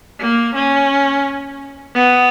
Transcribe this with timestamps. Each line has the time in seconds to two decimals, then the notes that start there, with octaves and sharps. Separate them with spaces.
0.20 A#3
0.55 C#4
1.95 B3